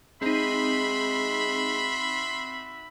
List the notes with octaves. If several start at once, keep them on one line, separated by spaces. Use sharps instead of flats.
G#3 C4 D#4 F#4 E5 B5 C6